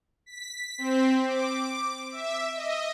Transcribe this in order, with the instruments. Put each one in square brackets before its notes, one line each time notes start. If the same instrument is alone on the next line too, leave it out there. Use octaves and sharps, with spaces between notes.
[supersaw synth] B6
C4
D6
E5
D#5